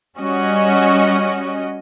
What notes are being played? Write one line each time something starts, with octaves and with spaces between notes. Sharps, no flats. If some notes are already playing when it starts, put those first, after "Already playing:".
G3 C#4 F#4 D#5